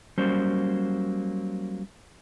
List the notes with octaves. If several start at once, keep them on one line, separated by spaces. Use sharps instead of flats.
F#3 G3 A#3 C#4 C5